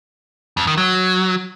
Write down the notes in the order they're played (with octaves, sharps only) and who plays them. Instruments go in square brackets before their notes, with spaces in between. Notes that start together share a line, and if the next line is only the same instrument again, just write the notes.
[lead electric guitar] F2
D#3
F#3